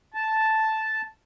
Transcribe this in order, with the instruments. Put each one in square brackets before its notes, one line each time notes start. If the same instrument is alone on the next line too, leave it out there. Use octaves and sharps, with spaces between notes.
[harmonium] A5